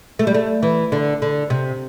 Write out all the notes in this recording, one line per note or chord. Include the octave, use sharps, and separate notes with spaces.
A3
G3
A3
E3
D3
D3
C3